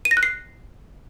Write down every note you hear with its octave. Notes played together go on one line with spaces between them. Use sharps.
D#7
A#6
F#6
C7